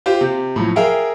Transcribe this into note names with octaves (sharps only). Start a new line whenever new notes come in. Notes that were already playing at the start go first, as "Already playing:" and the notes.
F4 G4 C5
C3
A2 F3 F#3
G#4 A#4 E5 F5 G5